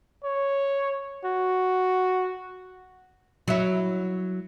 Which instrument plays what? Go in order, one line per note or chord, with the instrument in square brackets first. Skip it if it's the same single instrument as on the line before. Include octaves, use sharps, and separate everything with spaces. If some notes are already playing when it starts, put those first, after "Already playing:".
[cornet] C#5
F#4
[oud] F#3 E4